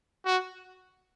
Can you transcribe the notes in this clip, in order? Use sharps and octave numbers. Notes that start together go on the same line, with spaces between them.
F#4